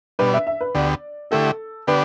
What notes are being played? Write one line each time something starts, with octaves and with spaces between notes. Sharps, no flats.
B2 G3 D4 B4
E5
E5
B4
D2 D3 B3 G4 D5
D3 A3 E4 G4 A4
D3 B3 D4 G4 B4